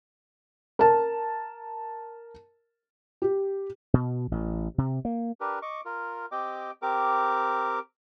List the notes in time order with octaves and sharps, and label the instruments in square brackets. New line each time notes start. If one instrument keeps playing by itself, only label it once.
[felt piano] A#4 A5
G4
[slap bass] B2
A1
C3
A#3
[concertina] D4 G4 A#4 B4
D#5 C#6 D6
F4 A#4
C4 G4 D#5 G5 D6
C4 G4 A#4 D6